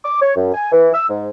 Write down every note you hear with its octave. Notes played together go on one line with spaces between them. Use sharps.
D6
C#5
F#2
G#5
E3
E6
G#2